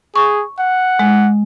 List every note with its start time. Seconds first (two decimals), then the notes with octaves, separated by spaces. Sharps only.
0.16 G#4 C#6
0.59 F#5
0.99 G#3